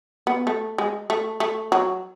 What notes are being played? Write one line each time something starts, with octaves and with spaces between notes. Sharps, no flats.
B3
A3
G#3
A3
A3
F#3